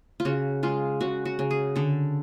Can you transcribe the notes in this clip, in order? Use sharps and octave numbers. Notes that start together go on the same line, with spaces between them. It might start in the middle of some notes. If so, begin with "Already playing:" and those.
F4
C#3 F#4
G#3 F4
C#3 F#4
F#4
C#3
G#4
D3 A4